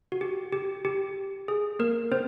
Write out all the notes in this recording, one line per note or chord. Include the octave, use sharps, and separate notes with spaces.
F#4
G4
G4
G4
G#4
A#3 A#4
C4 C5